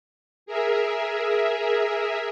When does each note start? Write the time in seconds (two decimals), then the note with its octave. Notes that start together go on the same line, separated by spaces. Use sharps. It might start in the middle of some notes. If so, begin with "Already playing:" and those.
0.46 G#4 A#4 E5